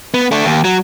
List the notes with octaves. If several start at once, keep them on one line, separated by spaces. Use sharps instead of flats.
B3
A3 D4
D#2
F#3